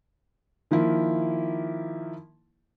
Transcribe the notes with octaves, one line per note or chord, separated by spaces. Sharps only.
D#3 F3 A#3 E4